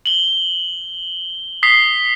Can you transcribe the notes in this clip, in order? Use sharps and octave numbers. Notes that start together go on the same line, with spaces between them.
F#7 G7
D#6 B6 C7 G7